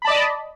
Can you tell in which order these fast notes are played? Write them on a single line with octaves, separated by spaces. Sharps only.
B5 A5 D5 D#5